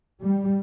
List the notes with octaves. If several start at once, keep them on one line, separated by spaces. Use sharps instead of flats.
G3